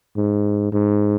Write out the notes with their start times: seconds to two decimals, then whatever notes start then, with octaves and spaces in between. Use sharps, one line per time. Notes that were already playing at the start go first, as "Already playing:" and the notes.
0.17 G#2
0.73 G#2